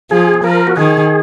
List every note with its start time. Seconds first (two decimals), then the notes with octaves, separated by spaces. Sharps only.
0.11 F3 G#4
0.44 F3 A#4
0.67 F#4
0.77 D#3 G#4